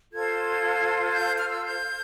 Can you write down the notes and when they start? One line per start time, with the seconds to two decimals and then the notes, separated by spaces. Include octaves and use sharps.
0.12 F4 A4 C5 G#6
1.14 G6
1.38 F6
1.48 E6
1.66 G6